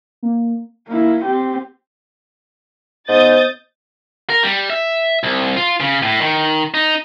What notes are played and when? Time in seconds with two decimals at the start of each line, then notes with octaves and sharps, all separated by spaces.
0.23 A#3
0.89 A#3 E4
1.25 C4 G4
3.08 G#2 B3 C5 D#5 D#6 G6 A6
4.30 A#4
4.43 G3
4.70 E5
5.23 C2
5.57 F4
5.80 C#3
6.03 A2
6.21 D#3
6.74 D#4